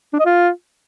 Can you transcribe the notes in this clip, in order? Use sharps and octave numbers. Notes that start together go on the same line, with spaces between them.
D4
D#5
F4